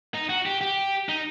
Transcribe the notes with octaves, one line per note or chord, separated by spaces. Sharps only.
D#4
F#4
G4
G4
D#4